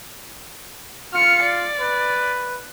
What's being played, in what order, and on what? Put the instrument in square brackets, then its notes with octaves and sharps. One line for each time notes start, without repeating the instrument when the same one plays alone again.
[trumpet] F4 [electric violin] F6 C#7
[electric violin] D5
[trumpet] B4